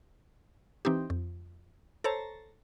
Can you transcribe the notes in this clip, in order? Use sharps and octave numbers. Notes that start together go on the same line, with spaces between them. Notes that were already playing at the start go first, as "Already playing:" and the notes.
E3 C4 D#4 G4
F2
A4 C5 C#5 A5 A#5